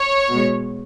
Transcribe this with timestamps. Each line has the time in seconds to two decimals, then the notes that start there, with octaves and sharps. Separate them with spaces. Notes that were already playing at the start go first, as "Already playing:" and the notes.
Already playing: C#5
0.28 B2 G#3